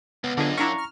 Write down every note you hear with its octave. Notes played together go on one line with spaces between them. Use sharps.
C#2 B3
F#2 D3 D4 F4 G#4 D#5
C#4 D4 E4 F4 F5 A#5 C#6 A#6
F6